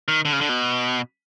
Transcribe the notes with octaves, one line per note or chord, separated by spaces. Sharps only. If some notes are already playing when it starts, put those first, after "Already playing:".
D#3
D3
C#3
D3
B2